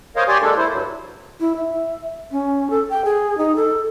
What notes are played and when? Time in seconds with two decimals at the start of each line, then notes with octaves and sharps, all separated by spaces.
0.16 A#4 C5 C#5 D#5 F5
0.28 G4 C#5 D5 G#5 C6
0.42 G#3 A#3 D4 A4
0.57 E4 C5
0.71 G2 F#3
1.40 E4
1.56 E5
2.32 C#4
2.70 A4
2.90 G5
3.05 G#4
3.38 D#4
3.56 A4